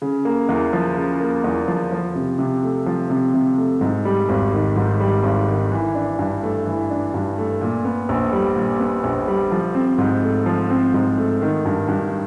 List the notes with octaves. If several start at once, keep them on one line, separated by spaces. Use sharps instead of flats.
C#3
A#3
E2
F3
C#3
A#3
E2
F3
F3
C3
C3
A3
F3
C3
C3
A3
G#2
G3
G#1
D#3
G#2
G3
G#1
D#3
E3
D4
G2
A3
E3
D4
G2
A3
A#2
B3
A#1
G3
A#2
B3
A#1
G3
F3
C4
G#2
A3
F3
C4
G#2
A3
D#3
G2
G2